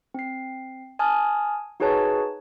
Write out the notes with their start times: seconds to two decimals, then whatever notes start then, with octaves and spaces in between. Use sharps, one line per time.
0.14 C4 C7
0.99 G#5 A5 D#6 F6
1.80 D#4 F#4 G#4 B4 C#5 A5